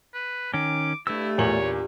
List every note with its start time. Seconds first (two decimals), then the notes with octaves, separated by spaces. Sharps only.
0.14 B4
0.54 D#3 C#4 D6
1.07 G2 A3 E4 E6
1.38 E2 A#2 C#5 F#7